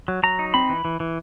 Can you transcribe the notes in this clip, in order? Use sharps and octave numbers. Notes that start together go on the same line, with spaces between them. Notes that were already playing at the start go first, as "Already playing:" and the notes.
F#3
F#3 A#5
D#4
C4 B5
E3
E3
E3